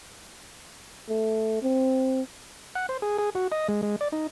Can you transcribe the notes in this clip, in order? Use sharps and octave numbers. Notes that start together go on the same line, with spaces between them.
A3
C4
F#5
C5
G#4
G#4
F#4
D#5
G#3
G#3
D5
D#4